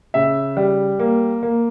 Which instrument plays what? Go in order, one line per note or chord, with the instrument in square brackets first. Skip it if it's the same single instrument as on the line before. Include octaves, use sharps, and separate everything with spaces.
[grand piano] C#3 E5
G3
A#3
A#3